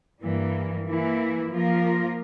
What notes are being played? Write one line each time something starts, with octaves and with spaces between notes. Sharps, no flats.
G2 E3 G3 A#3
E3 A#3 E4
F3 A#3 F4 A#4